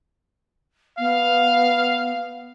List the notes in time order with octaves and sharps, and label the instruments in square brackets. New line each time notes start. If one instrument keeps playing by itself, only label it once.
[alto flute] B3 [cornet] F5